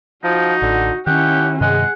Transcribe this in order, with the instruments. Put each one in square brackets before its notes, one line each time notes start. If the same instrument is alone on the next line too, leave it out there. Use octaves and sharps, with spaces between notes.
[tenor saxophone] F3 [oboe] D#4 [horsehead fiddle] F#4
[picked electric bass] A1 [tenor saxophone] D3
[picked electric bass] D#3 [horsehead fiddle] C#4 E4 [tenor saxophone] G4 [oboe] F#5
[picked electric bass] G2 C3 D#3 [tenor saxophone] G#3 [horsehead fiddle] G#4 [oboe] F#5